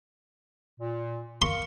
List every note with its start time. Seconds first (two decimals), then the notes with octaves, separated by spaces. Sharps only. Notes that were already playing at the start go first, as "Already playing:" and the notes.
0.80 A#2
1.42 A#4 F5 C6 C#6